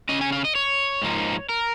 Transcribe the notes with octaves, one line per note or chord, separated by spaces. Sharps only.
C#3 F3 C#4 D#5
G#5
F5
D#5
C#5
G#2 F3 A#3 D#4
A#4